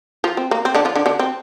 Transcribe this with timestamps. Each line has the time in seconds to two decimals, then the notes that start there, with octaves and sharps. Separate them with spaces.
0.24 F3 F4
0.37 C4
0.51 A#3
0.65 C4
0.75 D3 D4
0.85 F3 F4
0.95 D3 D4
1.06 D3 D4
1.19 C4